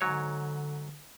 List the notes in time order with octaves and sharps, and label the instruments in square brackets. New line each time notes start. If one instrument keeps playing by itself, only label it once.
[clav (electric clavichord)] G#2 F#3 C#5 [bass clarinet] D3